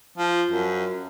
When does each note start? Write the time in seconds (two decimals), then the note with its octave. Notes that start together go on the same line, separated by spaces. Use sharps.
0.18 F3
0.51 F#2